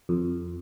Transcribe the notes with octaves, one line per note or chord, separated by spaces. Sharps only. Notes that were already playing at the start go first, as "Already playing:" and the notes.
F2